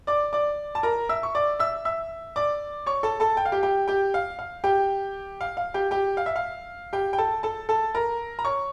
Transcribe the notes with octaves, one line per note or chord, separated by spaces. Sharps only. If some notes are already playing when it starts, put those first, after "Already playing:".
D5 D6
D5 D6
A5
A#4 A#5
E5 E6
C#6
D5 D6
E5 E6
E5 E6
D5 D6
C#5 C#6
A4 A5
A4 A5
G5
F5
G4 G5
G4 G5
G4 G5
F5
F5
G4 G5
F5
F5
G4 G5
G4 G5
F5
E5
F5
G4 G5
G5
A4 A5
A4 A5
A4 A5
A#4 A#5
A#5
C#5 C#6